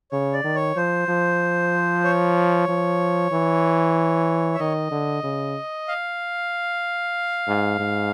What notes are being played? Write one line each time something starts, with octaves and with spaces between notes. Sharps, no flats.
C#3 C#5
D5
D#3
C#5
F3 C5
F3
C#5
F3
E3
E5
D#3 D#5
D3
C#3
F5
G#2
G#2